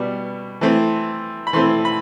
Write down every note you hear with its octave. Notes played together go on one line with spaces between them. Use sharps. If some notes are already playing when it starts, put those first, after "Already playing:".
Already playing: B2 G3 B3
E3 A3 C4
B5
E3 A3 C4 C6
B5